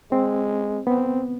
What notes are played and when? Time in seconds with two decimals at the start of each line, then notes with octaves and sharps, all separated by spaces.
0.11 G#3 C4
0.87 B3 C4